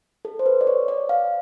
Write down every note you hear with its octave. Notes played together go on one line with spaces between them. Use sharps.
A4
C5
B4
D5
C#5
D5
F5